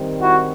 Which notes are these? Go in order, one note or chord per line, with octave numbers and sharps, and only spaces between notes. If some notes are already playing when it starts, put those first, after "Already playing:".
Already playing: D#3 G3 C4
E4 F#4